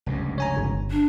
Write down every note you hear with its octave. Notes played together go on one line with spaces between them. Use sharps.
F1 C#2 G2
C#5 G#5 A#5
G1
D4